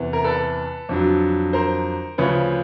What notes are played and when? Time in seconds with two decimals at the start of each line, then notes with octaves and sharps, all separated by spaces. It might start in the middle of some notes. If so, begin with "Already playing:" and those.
Already playing: E2 C3 E3
0.13 A#4
0.24 A4 B4
0.89 F2 D3 F#3
1.53 A#4 C5
2.18 D2 C#3 F3 B4 C#5